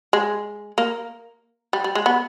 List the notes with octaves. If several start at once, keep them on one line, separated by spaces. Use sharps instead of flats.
G#3
A#3
G3
G3
G#3
B3